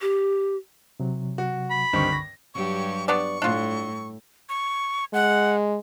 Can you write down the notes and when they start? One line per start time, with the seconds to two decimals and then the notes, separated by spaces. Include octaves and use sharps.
0.01 G4
1.00 C3 F#3
1.38 F#4
1.70 B5
1.93 C#2 G2 D3 D#3 C4 C#6
2.12 A#6
2.54 G2 F#3 G4 C#6
3.08 B3 D4 D5 C#6
3.42 A2 D4 F4
4.49 C#6
5.14 G#3 F#5